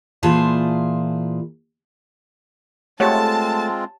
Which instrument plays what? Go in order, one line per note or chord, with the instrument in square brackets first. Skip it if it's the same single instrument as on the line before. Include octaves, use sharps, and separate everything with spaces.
[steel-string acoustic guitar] A#2 E3 F4 G#4 C5 A5
[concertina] G#3 C4 F4 [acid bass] A3 [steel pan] G4 C#5 F#5 [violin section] A5